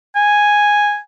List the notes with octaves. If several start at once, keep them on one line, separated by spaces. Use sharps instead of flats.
G#5